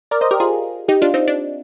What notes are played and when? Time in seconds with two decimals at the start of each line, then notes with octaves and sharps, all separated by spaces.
0.11 A#4 D5
0.21 C5 D#5
0.31 G4 A#4
0.40 F4 G#4
0.88 D#4 G4
1.02 D4 F4
1.14 C4 D#4
1.28 D4